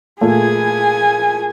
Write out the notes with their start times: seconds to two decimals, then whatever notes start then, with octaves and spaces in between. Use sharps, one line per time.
0.21 A#2 A3 G#4 G#5